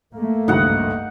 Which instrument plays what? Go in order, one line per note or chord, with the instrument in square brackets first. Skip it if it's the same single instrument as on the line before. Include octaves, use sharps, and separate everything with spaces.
[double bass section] A3 A#3
[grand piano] G#1 C#2 G2 [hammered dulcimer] D#4 F#5